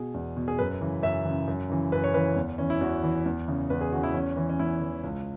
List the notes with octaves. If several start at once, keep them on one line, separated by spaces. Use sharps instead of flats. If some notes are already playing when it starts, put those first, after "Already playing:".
Already playing: B2 G#4
E2
B2
G#4
F#2 B4
C#3 E3
F#2 E5
C#3 E3
F#2
C#3 E3
F#2 B4
C#5
C#3 E3 B4
E2
E3 C#4
E4
E2 F#4
E3
E2
C#3 E3
E2 B4
G#4
C#3 E3 F#4
E4
E2 C#4
E3
C#4
E2 E4
E3
C#2